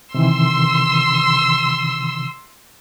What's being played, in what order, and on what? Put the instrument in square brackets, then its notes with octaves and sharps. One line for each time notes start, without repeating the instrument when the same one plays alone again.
[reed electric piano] C3 D#3 E3 [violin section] C6 E6